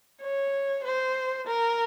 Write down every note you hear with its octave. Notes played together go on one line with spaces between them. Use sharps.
C#5
C5
A#4